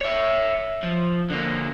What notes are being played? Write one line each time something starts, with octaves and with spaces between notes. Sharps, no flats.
C#5 E5
F3
D3 A#3